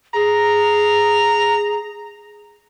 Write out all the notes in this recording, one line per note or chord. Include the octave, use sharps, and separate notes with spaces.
G#4 A#5